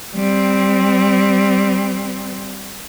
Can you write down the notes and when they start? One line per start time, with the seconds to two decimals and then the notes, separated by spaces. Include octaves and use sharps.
0.15 G3 C4